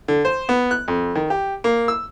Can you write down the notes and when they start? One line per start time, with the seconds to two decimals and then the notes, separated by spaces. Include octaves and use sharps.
0.08 D3
0.25 C5
0.49 B3
0.71 F#6
0.88 F2
1.16 D#3
1.30 G4
1.64 A#3
1.88 E6